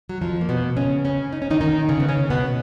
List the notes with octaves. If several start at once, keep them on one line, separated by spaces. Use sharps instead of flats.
F#3
F2 F3
A#3
B2 B3
C#3 C#4
C#3 C#4
D#4
C#4
D#3 D#4
D#3 D#4
C#3 C#4
B3
C#3 C#4
B2 B3